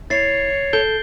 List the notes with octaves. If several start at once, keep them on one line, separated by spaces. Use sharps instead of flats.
E4 C#5 A6 C7
A4 G6 D7 G7